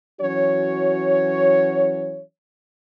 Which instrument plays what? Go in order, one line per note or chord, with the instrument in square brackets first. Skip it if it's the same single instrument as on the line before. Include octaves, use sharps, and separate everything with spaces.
[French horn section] E3 F#3 C#4 F#4 C#5